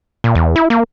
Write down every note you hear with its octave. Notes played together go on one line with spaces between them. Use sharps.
A#2
E2
E4
A#3